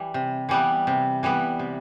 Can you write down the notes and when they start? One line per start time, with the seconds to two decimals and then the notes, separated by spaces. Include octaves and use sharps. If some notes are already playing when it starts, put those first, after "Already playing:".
Already playing: E3 G3
0.14 C3
0.49 E3 G3 B3
0.87 C3
1.23 E3 G3 B3
1.59 C3